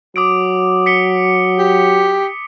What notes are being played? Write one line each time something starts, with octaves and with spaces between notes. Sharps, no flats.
F#3 D6 D#6 D7
B6 C#7 G7
G4